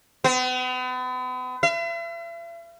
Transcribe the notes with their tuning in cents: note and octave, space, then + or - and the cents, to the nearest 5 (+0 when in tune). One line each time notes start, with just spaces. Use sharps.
B3 +40
E5 +45